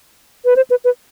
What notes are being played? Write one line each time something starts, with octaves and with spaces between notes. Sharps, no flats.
B4
C5
B4
B4